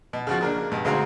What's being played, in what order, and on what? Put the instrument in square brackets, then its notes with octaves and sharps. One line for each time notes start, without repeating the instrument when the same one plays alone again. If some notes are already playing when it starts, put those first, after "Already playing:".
[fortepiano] B2
C#3 F3 F#4
C#3 A#3 D4
G2 B2
D2 G#3 C4 F#4 F5 A#5